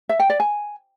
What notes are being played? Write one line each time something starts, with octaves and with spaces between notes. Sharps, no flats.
E5
G5
D5
G#5